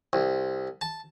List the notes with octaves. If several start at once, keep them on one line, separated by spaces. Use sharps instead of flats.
C2
A5